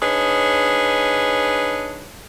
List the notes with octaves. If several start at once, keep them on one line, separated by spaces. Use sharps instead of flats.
D4 D#4 G#4 B4 C#5